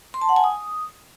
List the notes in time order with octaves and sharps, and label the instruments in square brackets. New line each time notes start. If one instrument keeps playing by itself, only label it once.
[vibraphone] C6
A5
F#5
G#5
D#6